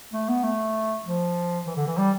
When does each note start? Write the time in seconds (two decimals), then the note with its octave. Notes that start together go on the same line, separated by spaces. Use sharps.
0.13 A3
0.29 B3
0.44 A3
1.05 F3
1.67 E3
1.77 D3
1.87 E3
1.98 G3